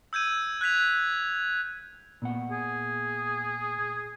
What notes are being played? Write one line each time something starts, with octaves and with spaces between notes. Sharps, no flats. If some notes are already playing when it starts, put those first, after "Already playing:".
E6 G6 G#6 D#7
F#6 G#6 B6 F7
A#2 B3 F#5
G#4